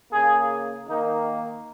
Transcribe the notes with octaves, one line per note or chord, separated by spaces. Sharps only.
C#3 A#3 G#4
D#3 A#3 D#4